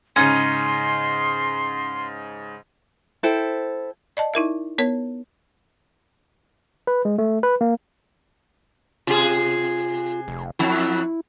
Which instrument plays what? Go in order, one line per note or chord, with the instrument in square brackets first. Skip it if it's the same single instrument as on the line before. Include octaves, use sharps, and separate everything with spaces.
[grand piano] G#2 C#3 [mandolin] C#4 D#4 [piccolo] C6
[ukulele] E4 A4 C5 G5
[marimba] D5 D#5 A5
D#4 E4 A#4 E5
B3 A#4 C#5
[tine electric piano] B4
G#3
A3
B4
A#3
[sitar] C3 G#4 [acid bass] F4
[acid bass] F1
[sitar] F2 F#3 [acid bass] E4